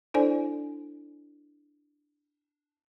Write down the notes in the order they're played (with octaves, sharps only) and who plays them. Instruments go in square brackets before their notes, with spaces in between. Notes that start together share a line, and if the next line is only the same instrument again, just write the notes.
[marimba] D4 E4 A4 C5 D5 G#5